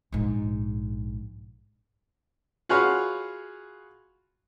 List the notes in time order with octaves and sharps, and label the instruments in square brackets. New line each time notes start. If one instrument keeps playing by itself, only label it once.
[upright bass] A#1 G#2
[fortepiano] F4 F#4 G#4 B4 C#5 F5